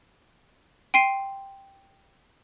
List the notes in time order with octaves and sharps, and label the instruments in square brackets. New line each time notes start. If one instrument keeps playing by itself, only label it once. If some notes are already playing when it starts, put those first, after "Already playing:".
[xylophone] G5 C6 C7 D#7